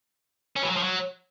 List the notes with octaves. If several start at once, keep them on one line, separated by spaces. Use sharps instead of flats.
C#4
E3
F#3
F3
F#3